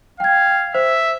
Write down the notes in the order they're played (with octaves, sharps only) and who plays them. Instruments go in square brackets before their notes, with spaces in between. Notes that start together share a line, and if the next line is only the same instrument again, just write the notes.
[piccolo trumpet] F5 [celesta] G5 G#6
[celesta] C5 [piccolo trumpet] E5